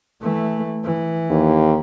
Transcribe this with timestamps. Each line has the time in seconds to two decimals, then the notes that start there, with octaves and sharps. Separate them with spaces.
0.22 E3 A3
0.84 E3
1.30 D#2